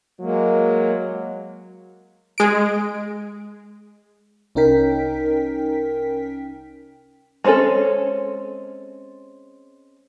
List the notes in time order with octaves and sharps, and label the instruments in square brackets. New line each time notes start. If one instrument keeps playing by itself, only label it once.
[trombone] F#3 [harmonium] G#3 A#3
[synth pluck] G#3 D7
[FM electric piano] C2 C#4 D#4 A#4 G5 B6
[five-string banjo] G#3 C4 C#4 G#4 A4